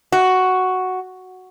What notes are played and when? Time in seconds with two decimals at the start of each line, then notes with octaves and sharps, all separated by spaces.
0.12 F#4